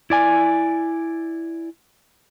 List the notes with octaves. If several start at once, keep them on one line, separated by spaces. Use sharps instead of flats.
E4 D5 G#5